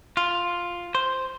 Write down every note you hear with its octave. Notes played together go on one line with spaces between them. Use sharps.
F4
C5